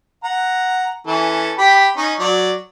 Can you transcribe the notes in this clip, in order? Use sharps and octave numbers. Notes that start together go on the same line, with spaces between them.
F#5 A#5
E3 C#4 A4
G4 G5 B5
C#4 D#4
F#3 D5